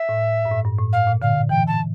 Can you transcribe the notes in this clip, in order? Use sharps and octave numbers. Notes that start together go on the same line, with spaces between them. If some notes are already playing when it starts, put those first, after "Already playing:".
Already playing: E5
A2
G2
A2
G2
A2
F5
A#2
D3 F5
E3 G5
A5